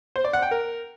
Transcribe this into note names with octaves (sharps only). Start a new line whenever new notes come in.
C5
D5
F#5
G5
A#4